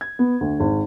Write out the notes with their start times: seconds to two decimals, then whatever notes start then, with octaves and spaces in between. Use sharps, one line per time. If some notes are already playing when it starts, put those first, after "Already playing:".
0.01 G#6
0.19 B3
0.41 D2
0.60 G#1